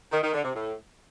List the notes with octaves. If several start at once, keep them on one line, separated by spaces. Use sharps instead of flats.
D#3
D#3
D3
C3
A2